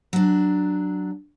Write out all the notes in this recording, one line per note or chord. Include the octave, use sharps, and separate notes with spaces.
F#3 D4